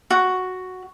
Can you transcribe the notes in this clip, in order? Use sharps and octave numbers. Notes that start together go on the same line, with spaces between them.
F#4